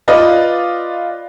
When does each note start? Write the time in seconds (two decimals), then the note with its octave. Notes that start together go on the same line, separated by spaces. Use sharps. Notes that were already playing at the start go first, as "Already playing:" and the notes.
0.08 F4 B4 D5 D#5 F5